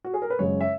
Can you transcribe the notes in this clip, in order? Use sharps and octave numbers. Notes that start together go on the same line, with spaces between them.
F#4
G#4
A#4
B4
F#1 F#2 C#3 G#3 C#5
E5